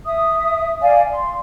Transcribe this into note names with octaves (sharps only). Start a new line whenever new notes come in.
E5 D#6
D5 F5 G#5
C6